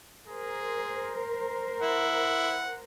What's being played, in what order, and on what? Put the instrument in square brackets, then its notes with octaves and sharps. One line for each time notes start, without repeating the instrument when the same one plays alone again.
[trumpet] G#4 [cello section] A#4 C5
[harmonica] E4 [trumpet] F#5